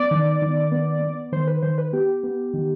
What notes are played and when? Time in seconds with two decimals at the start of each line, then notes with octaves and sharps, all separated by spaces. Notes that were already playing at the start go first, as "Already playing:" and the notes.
Already playing: B3 D5
0.11 D#3
0.42 D#3
0.72 B3
1.02 B3
1.32 D#3 C5
1.47 B4
1.63 D#3 C5
1.78 B4
1.93 B3 G4
2.23 B3
2.54 D#3